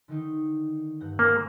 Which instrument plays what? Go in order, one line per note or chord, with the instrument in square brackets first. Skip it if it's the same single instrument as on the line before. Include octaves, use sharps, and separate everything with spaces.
[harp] D3 D#3 D#4
G2 F#5 G6
[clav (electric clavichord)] A#3 [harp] G#4 C5